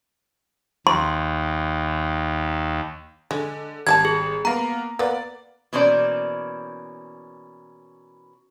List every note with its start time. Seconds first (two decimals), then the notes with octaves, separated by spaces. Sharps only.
0.87 D#2 C6
3.31 D3 G#3
3.87 G#1 G3 A4 A5 G#6
4.05 G#4
4.45 A#3 B3 A#5
4.99 A#3 B3 D5
5.73 B2 E3 A#3 C#4 C5 D5